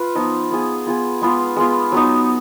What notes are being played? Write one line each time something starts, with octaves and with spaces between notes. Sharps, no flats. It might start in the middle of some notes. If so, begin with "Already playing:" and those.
Already playing: F4 B4
F3 B3 D#4
B3 F4 G#4
B3 F4 G#4
G#3 B3 F4
G#3 B3 F4
F#3 B3 D#4